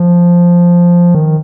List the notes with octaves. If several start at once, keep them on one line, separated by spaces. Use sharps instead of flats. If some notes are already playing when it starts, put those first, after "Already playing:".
Already playing: F3
D#3